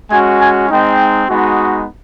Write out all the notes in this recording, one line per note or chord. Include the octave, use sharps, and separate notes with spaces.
G#3 C#4 F#4 G#5
G#5
G#3 C4 D#4 G5
G#3 B3 D#4 F#4